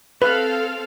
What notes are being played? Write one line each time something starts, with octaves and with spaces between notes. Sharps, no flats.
C4 A4 B4 F5